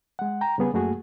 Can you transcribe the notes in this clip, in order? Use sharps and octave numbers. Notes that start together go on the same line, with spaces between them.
G#3 F#5
G5 A#5
C#3 G3 B3 G#4
F#2 A3 A#3 F#4 G#4